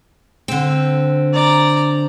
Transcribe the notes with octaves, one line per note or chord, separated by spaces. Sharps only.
D3 C4
D5 A#5